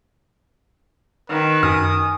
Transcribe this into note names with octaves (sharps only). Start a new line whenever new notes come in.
D#3 B4
F#2 G#5 D#6 F6